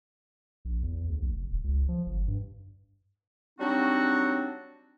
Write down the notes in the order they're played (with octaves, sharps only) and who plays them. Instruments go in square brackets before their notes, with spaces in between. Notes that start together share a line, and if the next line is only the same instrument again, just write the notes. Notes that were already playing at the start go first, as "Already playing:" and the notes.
[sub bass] A#1
E2
D2
A#1
F1
D1
C#2
F3
G1
G2
[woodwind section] F#3 G3 C4 D4 D#4 F#4